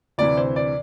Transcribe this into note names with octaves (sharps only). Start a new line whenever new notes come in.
D2 C3 E3 D5
C5
D5